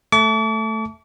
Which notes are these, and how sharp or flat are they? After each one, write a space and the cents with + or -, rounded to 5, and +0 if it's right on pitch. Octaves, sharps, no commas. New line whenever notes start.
A3 +0 A5 -10 D6 -45